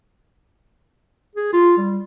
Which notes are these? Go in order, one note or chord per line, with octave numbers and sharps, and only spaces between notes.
G#4
F4
G3